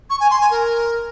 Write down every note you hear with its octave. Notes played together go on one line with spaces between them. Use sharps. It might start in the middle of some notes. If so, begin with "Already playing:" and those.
C#6
G#5
C6
G#5
A#4